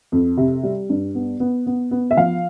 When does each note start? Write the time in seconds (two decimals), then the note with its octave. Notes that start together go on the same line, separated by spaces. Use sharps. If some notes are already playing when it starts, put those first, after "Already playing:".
0.12 F2
0.37 C3
0.63 G3
0.90 G2
1.15 B3
1.40 B3
1.66 B3
1.91 B3
2.11 E5
2.17 F3 F5